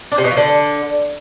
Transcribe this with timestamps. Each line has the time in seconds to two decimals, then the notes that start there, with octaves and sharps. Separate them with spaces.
0.12 D4
0.18 C3
0.24 B2
0.31 F3
0.37 D3